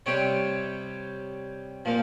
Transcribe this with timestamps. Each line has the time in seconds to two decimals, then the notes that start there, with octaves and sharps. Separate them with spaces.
0.06 C3 G3 C4 G4 C#5
1.85 A#2 F3 A#3